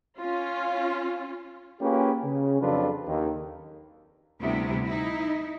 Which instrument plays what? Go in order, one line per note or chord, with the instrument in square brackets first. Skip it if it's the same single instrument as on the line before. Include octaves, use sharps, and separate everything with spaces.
[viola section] C#4 F4
[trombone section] A#3 C#4 F4 G4 G#4 B4
C#3
F2 F#3 D4 F4 A4 B4
D#2
[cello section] D2 C3 G3 B3 E4
D#4 E4